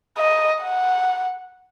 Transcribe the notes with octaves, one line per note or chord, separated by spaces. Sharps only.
D#5
F#5